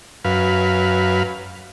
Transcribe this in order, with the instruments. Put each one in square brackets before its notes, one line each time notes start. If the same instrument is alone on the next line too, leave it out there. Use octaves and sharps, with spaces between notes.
[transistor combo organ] F#2 B4 F5